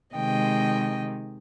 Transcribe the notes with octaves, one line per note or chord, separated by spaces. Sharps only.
C3 D#3 G#3 D#5 G5